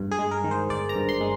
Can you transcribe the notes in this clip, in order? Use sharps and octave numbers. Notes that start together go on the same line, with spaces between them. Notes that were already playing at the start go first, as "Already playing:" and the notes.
Already playing: G2
G#4
G#3
A#4
D#3
C5
G1 D5
A#5
G2
C6
G#3